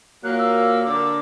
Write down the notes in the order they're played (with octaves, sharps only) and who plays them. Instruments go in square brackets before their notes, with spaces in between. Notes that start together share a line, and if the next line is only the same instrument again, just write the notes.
[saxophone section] A#2 F#3 A#3 [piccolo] F#6
[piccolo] E6
[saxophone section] D3 A#3 D4 [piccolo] D6